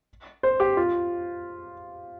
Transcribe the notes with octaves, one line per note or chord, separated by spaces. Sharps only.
C5
G4
F4